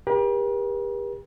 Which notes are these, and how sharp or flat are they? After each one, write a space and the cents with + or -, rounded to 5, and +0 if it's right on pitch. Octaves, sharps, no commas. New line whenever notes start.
G4 +35 A#4 +45